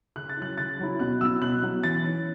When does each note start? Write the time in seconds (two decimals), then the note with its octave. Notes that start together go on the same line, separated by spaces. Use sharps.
0.16 C#3 F#6
0.29 A6
0.37 F#3 C#4 E4 F#6
0.58 C#3 A6
0.80 F#3 C#4 E4
1.00 B2 F#6
1.21 F#3 B3 E4 E6
1.42 B2 F#6
1.62 F#3 B3 E4
1.83 E3 A6
2.04 C#4 E4